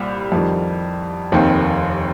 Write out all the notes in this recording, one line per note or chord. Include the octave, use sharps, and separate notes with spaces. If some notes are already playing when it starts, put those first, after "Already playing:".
Already playing: C2 A#2 G3
F2 D#3 G3
F1 D#2 D#3 C4